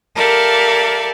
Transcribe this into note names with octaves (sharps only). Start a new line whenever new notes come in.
G4 A4 A#4 D5 E5 F5